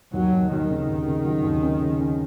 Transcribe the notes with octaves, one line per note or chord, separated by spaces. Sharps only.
D#2 F#3
D#2
D#2 D#3
C#3
D#2
C#3
F#3
D#2
C#4
C#3
C#4